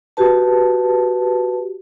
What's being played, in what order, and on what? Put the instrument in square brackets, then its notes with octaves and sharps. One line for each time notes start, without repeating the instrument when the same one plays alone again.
[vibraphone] F#4 G4 B4 A5